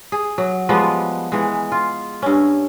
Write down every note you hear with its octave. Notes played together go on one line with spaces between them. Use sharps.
G#4
F#3
F3 G3 G#3 B3
E3 G#3
F4
G2 C#4